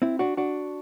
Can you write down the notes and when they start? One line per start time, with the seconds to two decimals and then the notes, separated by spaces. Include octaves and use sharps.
0.02 C4 E4
0.19 D4 F#4
0.37 D4 F#4